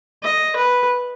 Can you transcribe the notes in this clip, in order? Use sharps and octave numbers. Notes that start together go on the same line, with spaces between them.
D#5
B4